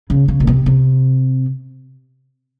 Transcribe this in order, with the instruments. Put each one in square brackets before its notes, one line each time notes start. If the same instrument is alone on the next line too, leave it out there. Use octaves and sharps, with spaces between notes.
[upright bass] C#3
C#3
A#2
C3
C3